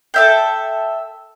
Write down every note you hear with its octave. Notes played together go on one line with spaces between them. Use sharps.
A4 E5 G5